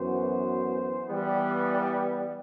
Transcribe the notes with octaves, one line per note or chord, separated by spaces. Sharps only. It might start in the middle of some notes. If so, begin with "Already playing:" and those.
Already playing: F#2 E3 B3 F#4 C5
E3 G3 B3